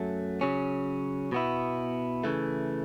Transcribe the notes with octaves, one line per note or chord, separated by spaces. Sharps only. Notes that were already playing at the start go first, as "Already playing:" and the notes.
Already playing: F#2 F#3 A3
C#3 F#3 C#4
B2 B3 E4
C#3 E3 A3